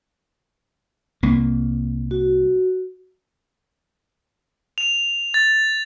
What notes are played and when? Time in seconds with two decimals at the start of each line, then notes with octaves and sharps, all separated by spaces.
1.23 C2 A#3
2.11 F#4
4.78 F7
5.34 A6